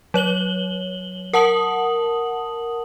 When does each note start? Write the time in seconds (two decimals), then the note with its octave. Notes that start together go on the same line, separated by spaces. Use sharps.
0.14 F#3 C#5 F#7 G7
1.33 A#4 F#5 A5 D#6 F#7